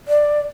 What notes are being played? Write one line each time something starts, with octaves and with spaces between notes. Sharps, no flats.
D5